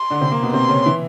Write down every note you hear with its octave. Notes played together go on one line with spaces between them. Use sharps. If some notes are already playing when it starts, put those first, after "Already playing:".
Already playing: C6
D3 D4
C3 C4
A#3
B2 B3
C3 C4 C6
C#3 C#4
E3 E4